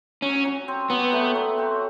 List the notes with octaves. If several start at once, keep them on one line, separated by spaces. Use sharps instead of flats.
F#3 C#4
F#3
C4
F#3 B3
A3
F#3
C4